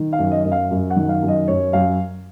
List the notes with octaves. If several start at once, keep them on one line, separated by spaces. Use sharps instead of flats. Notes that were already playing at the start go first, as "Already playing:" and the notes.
Already playing: D#3
F5
F#2
D#5
F#2 D#5
F5
F#2
F#5
D#3
F5
F#2
D#5
F#2 C#5
F#2 F5